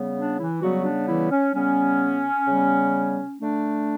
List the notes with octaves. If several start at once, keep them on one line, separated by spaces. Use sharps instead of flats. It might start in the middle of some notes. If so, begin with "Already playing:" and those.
Already playing: C#3 G3 B3
D4
E3 E4
C#3 F#3 G3 B3 F#4
D4
E3 E4
C#4
C#3 G3 B3 C#4
C#3 G3 B3
D3 A3 D4